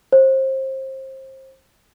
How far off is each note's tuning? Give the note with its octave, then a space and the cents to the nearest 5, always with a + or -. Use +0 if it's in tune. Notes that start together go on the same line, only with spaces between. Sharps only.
C5 +25